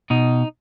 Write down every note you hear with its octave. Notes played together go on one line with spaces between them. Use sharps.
B2 D#4